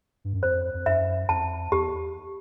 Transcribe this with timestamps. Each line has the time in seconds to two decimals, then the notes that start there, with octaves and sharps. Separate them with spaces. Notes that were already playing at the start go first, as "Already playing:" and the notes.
0.24 G2
0.33 F#2
0.43 F2 C5
0.74 F2
0.86 F#2 E5
1.29 F2 A5
1.72 E2 G4